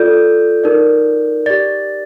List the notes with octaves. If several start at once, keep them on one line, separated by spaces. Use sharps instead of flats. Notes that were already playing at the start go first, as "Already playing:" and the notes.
Already playing: F4 A4 D5 G6
D#4 A#4 D5
G4 D5 A6